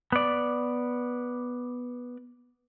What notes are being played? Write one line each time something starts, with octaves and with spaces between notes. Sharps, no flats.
B3 D5